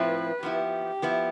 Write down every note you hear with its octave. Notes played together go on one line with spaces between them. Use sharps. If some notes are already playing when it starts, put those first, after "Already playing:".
Already playing: A2 F3 C4 E4 B4
F3 B3 E4 G4
F3 B3 E4